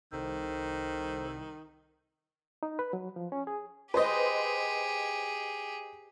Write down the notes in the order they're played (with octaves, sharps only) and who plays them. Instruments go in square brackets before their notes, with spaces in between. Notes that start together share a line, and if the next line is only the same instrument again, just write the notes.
[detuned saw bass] C2 [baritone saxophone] D#3 [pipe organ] A4 C5
[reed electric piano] D#4
B4
F#3
F3
C#4
G#4
[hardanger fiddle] G4 G#4 [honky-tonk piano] B4 C5 D#5